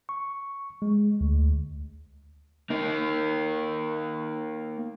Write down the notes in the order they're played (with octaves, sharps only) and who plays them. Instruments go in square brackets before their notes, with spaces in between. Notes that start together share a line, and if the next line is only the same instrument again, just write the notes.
[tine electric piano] C#6
G#3
D2
[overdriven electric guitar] A#3 D#4